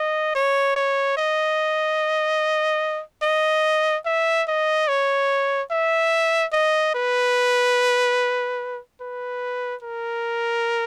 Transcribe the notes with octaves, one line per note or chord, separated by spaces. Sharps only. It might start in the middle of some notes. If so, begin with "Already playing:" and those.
Already playing: D#5
C#5
C#5
D#5
D#5
E5
D#5
C#5
E5
D#5
B4
B4
A#4